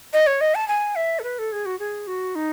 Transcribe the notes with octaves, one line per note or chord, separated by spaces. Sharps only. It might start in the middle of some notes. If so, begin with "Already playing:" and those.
D#5
C#5
D#5
A5
G#5
E5
A4
B4
A4
G#4
F#4
G#4
F#4
D#4